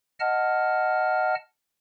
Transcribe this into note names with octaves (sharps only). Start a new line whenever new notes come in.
D#5 F#5 A5 F6